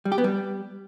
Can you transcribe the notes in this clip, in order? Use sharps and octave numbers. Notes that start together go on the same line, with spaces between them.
G3
G4
B3
G3